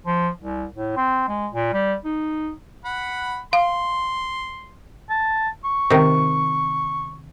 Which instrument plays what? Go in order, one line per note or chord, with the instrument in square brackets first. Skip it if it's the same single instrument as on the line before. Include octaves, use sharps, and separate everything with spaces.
[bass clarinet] F3
C2
A2
C4
G#3
A#2
G3
D#4
[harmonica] F#5 B5
[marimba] F5 [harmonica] C6
[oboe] A5
C#6
[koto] C3 D#3